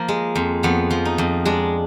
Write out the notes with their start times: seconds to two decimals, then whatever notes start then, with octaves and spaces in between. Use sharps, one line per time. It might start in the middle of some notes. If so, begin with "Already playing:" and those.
Already playing: F3 A#3
0.08 G#3
0.35 F2
0.63 F2 B3
0.91 F3
1.05 D#4
1.18 F2
1.45 G#3 D4